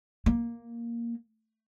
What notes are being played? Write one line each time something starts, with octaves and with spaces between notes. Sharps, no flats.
A#3